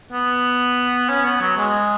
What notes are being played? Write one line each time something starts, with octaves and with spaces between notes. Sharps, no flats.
B3
C#4
B3
F#3
G#3